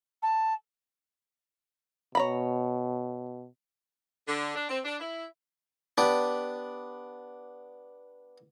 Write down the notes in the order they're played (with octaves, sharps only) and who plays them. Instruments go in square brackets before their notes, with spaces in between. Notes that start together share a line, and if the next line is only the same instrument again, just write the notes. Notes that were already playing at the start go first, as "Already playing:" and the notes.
[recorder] A5
[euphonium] B2 [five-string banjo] C#5 A#5 B5
[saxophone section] D3
D4
C4
D4
E4
[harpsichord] B3 D4 G4 B4 D6